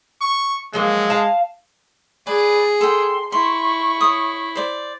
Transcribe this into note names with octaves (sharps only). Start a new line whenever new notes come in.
C#6
F3 F#3 G#3 A#3
F5 A5
G#4 B4 D5
A4 G5 C6
E4 C6 C#6
C#5 D#6
C5 D5